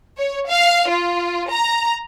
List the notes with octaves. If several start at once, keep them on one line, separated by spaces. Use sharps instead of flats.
C#5
F5
F4
A#5